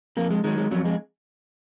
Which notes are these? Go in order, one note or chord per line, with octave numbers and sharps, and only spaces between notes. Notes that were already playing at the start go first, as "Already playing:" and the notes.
F2 A#3
G#3
D#3 F#3 G#3
G#3
F2 F#3
G#3